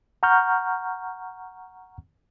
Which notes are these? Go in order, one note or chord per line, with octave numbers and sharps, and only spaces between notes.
F#5 A#5 C#6 F6 G6